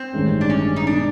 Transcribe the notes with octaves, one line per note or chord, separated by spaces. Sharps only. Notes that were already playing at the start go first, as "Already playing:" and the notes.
Already playing: C4
A1 G2 D#3 G#3 C#4
D4
C#4
D#4
B2 G#3 B3 D4